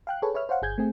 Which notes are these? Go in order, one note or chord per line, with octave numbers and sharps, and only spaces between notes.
F5 G5 F#6
G#4 A4 B4 C#5
B4 C#5 E5 F6
C5 C#5 F5 F#5
G1 G#4 G6 G#6
A3 C4 G#4